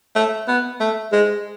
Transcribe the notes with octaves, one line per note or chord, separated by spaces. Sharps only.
A3
B3
A3
G#3